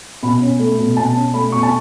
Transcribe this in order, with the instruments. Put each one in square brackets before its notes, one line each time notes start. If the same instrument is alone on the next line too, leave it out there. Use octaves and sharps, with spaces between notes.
[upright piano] B2 B5
C#4
A3
B2
B2 A5
C#4
A3 B5
B2 C#6
A5